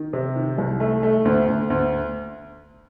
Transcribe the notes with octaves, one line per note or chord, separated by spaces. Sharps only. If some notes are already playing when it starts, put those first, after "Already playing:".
Already playing: D#3
C3
D#3
C2
A3
A3
D2
D2
D2